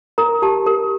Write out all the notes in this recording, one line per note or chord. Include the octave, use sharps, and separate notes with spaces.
A#4 A#5
G4 A5
A#4